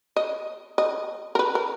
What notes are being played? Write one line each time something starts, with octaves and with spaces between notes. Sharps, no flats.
D#5
D#5
A#4
B4
A#4